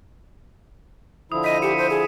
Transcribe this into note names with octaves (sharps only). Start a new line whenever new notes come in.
D3 F3 E4 D#6
D#5 B6 D#7
G4 C#7 E7
C5
G#4